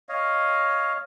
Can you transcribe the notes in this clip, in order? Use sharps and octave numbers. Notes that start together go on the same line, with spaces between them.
C#5 D#5 F5